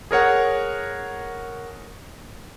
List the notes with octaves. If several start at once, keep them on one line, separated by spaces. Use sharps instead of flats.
G#4 A#4 C#5 F#5